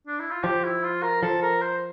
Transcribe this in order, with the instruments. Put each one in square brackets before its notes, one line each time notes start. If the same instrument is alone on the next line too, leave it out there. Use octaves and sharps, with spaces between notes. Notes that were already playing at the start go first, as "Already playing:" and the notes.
[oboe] D4
E4
F4
[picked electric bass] F3 [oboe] G4
[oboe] E4
F4
A#4
[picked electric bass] F3 [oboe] A4
[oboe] A#4
C5